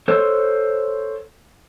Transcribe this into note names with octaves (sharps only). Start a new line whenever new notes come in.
A4 C5 C#5